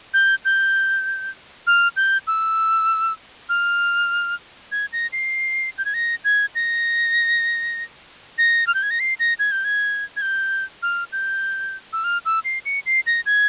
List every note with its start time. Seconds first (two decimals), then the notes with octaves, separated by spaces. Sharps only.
0.14 G6
0.45 G6
1.67 F6
1.96 G6
2.27 E6
3.49 F6
4.72 G#6
4.93 A#6
5.13 C7
5.78 G6
5.85 G#6
5.94 A#6
6.25 G#6
6.55 A#6
8.38 A#6
8.67 F6
8.75 G6
8.83 G#6
8.91 A#6
9.00 C7
9.20 A#6
9.39 G#6
9.52 G6
9.64 G#6
10.17 G#6
10.22 G6
10.83 F6
11.12 G6
11.93 E6
12.04 F6
12.25 E6
12.45 C7
12.65 C#7
12.86 C7
13.07 A#6
13.26 G#6